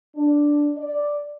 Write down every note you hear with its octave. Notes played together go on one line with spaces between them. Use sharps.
D4
D5